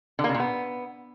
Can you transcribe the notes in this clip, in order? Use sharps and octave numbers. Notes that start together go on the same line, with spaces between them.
D3
A#3
C#3
A#2
B3